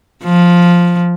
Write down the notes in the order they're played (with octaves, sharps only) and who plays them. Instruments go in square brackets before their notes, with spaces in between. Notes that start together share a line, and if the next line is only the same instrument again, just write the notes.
[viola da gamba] F3